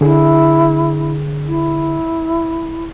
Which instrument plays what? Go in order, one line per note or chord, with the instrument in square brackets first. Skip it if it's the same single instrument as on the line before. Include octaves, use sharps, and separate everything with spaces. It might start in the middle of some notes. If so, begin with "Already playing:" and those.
[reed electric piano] D3 G#4 [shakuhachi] E4
[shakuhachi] E4